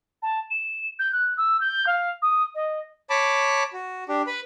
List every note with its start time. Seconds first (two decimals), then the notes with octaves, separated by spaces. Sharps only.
0.23 A5
0.51 E7
0.99 G6
1.13 F#6
1.37 E6
1.60 G6
1.87 F5
2.22 D#6
2.55 D#5
3.10 C#5 A5 B5 D6
3.73 F#4
4.08 D4 G4
4.27 B4 B5